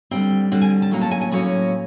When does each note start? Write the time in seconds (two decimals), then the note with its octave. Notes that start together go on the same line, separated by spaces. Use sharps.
0.11 D3 G3 C4 G5
0.52 D3 G3 C4 F#5
0.62 G#5
0.82 A5
0.91 A2 F#3 A#3 C#4 A#5
1.01 A5
1.11 G#5
1.21 G#5
1.32 A2 F#3 A#3 C#4 G#5